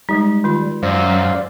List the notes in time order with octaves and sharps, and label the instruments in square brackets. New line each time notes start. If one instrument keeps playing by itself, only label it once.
[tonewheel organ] G3 [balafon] G#3 D#4
[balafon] D#3 F4
[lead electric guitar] F#2 [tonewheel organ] C5 D5 F5